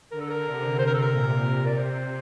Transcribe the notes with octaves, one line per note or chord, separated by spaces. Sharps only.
D3 A#4
A4
A#4
C3
C3 C5
A#4
A4
A#4
A#2
C3
D5
C5